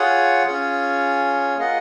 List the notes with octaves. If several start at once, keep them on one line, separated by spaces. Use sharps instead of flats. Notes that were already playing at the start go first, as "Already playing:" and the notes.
Already playing: F4 G#4 C#5 F#5
C#4 F4 G#4 C#5
A#3 F4 G#4 D#5 F#5